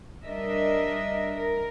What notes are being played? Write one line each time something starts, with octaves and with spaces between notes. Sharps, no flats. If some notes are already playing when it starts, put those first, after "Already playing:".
G3 D4 A#4 D#5 E5
A#4